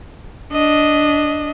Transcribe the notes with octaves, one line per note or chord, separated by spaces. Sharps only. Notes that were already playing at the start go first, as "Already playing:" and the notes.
D4 D#5